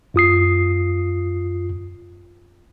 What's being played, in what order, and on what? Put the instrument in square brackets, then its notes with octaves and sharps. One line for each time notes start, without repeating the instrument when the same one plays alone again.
[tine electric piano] F#2 F4 D#6 C7